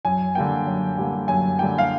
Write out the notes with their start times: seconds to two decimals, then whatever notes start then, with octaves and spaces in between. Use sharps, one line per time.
0.05 F#2 G#5
0.35 D3 G3 A#3 G5
0.67 F#2
0.97 D3 G3 A#3
1.28 F#2 G#5
1.58 D3 G3 A#3 G5
1.78 F5